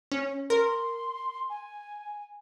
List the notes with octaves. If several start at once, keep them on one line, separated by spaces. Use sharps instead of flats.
C#4
A#4 C6
G#5